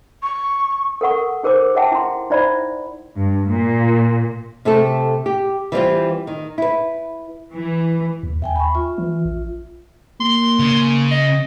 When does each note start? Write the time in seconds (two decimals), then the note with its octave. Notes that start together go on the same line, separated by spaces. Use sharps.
0.23 C#6
1.01 A4 A#4 F#5 C#6
1.43 D#4 G#4 A#4 C5 D6
1.75 G#4 C#5 E5 F#5 G5 A5
1.92 E4 C6
2.30 D#4 E4 C5 D5 E5 B5
3.16 G2
3.46 A#2
4.65 C3 A3 G4 A4
5.26 G4
5.72 E3 G3 C4 F4
6.27 D#3
6.58 E4 B4
7.54 E3
8.23 D#2
8.42 D#2 E5 G5 G#5
8.56 B5 C#6
8.75 F4 E5
8.98 E3
9.25 A#1
10.20 A#3 C6
10.59 C#3
11.11 D#5